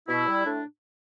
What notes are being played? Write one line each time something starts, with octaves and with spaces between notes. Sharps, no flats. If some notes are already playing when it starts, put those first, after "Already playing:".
B2 E4
G3
A2 D4